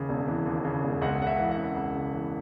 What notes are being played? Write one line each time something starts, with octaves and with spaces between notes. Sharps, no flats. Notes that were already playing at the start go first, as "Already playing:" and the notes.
Already playing: D#2 C#3 E3
E1
E3
D#2
C#3
E1
C#2 F#5
C#3 F#5
E5
E3
F#5
C#2
C#2
C#3
E3